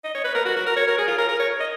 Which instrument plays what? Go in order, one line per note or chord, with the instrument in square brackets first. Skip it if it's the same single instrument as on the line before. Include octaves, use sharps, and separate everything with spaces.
[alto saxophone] D#5
C#5
B4
A#4
F#4
F#4
A#4
C#5
A#4
G#4
F4
A#4
A#4
C#5
D#5